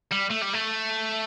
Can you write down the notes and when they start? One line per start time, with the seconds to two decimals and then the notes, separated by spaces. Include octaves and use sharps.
0.12 G3
0.31 A3
0.42 G3
0.54 A3